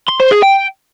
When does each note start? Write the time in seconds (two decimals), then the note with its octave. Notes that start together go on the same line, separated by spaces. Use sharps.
0.09 C6
0.20 C5
0.32 G#4
0.43 G5